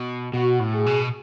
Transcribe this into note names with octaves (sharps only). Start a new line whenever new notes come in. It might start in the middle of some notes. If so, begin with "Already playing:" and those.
Already playing: B2
B2 F#4
A2
G#4
B2